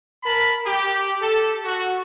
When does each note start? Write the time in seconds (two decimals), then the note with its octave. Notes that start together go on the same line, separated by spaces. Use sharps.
0.24 A#4 A5 B5
0.66 G4
1.21 A4
1.65 F#4